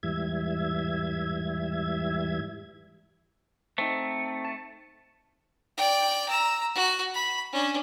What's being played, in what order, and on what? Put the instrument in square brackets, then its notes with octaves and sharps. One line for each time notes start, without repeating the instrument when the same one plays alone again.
[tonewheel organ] E2 G#2 E3 G3 E5 G#6
[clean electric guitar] A3 [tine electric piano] C4 D#4
[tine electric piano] A5
[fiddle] D5 G5
A#5 E6
F#4
B5
C#4 D4